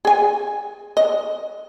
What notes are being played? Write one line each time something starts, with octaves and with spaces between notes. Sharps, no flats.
G#4 G#5
D#5